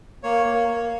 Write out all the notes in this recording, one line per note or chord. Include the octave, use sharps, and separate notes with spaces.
A#3 C#5
A#3
A#3